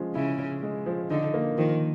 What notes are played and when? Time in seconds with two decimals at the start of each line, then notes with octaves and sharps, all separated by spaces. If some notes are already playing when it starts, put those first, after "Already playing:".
Already playing: F3 G#3 C#4
0.15 C#3 E4
0.39 C#4
0.63 G#3
0.86 F3
1.10 D3 D#4
1.34 A#3
1.58 D#3 F3